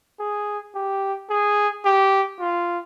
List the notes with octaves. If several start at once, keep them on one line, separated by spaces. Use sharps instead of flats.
G#4
G4
G#4
G4
F4